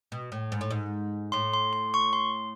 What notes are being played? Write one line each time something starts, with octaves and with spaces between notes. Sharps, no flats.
B2
A2
G#2
A2
G#2
A2 C6
C6
C6
C#6
C6